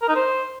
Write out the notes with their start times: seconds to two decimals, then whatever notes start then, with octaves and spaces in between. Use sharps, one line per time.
0.02 A#4
0.09 D#4
0.15 C5